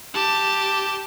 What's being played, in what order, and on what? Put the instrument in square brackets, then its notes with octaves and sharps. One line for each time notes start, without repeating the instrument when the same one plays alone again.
[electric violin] G4 A5